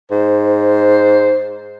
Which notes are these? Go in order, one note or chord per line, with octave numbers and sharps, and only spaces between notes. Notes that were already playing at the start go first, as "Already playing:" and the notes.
G#2 C5